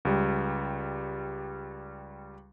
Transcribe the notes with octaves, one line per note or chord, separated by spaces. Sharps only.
C#2 G3